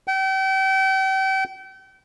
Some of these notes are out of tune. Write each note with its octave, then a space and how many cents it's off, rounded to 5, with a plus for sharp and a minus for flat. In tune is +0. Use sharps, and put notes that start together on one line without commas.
G5 -35